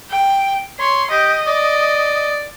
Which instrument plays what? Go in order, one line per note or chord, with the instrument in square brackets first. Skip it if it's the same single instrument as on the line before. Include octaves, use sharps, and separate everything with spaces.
[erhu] G5
[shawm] C#5 [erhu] C6
[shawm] G4 [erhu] D#5
[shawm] D5